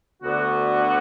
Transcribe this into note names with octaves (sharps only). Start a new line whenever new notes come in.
D2 D3 B3 F#4